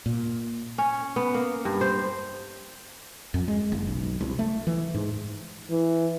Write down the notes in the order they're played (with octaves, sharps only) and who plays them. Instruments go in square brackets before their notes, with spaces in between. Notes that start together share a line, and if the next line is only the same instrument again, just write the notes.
[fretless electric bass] A#2
[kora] C#4
B3
A#3
G2
C5
[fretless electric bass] F2
G#3
F#1
B1
C2
A3
E3
G#2
[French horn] E3